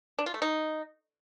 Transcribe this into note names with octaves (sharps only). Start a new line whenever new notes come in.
D4
F4
A3
D#4